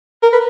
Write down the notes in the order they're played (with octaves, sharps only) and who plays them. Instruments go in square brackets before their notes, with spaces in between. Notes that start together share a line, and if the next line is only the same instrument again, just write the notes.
[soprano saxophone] A#4
B4